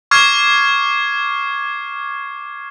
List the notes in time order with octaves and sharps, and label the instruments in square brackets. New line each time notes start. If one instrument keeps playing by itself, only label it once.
[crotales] C#6 D6 F6 G#6 C7